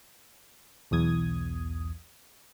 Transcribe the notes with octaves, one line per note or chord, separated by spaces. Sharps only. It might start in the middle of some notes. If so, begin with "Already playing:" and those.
B1 E2 D#6 G#6